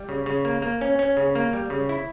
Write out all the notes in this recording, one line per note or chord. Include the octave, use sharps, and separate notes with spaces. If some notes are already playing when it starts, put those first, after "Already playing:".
Already playing: G3
C#3
C#3
A#3
A#3
C#4
C#4
C#3
A#3
G3
C#3
E4